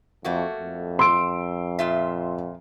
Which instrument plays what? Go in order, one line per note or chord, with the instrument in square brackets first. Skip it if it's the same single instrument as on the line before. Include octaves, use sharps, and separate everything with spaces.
[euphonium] F2 [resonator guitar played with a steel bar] A3 A#3 F#4
[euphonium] F2
[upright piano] C6 E6 D7
[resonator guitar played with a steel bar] A#2 F4 E5